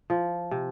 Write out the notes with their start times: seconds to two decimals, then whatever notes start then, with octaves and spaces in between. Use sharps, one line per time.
0.10 F3
0.51 C3